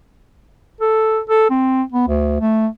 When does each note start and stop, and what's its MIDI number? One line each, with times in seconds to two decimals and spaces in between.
0.81 1.21 69
1.29 1.49 69
1.50 1.83 60
1.92 2.08 59
2.08 2.37 38
2.40 2.67 57